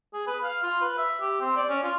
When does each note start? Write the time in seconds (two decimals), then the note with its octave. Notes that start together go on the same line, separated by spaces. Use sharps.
0.14 G#4
0.27 B4
0.44 F5
0.63 F4
0.81 B4
0.98 E5
1.21 G4
1.41 C4
1.56 D5
1.69 C#4
1.83 F4